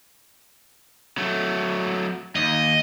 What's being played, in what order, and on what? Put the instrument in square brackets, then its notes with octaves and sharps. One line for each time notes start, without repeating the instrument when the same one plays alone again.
[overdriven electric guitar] F#3 A3
[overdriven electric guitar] D#2 [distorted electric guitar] D#5